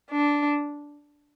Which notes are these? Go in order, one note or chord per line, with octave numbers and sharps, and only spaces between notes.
D4